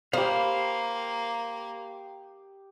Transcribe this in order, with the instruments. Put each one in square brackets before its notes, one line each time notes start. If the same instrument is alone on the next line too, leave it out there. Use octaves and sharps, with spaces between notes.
[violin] A#3 [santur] G4 D#6 [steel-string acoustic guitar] C5 [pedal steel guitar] F5 B5